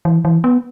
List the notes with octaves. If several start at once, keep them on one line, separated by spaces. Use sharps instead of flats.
E3
E3
B3